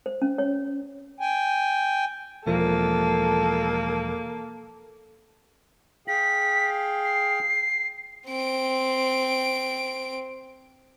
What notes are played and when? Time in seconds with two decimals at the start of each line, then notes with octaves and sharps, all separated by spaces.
0.06 C5
0.22 C#4
0.38 C#5
1.20 G5 G#5
2.47 E1 F3 A#3 A4
6.08 G#4 F5 G5 B6
7.04 C7
8.29 C4 D7